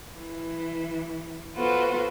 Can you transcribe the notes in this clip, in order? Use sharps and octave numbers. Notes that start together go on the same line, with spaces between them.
E3
B3 F4 F#4 A4 B4 C5